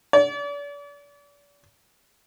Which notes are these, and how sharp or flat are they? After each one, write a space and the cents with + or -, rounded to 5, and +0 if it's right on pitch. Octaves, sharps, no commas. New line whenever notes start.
D5 -40